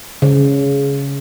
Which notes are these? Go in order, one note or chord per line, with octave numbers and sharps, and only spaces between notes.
C#3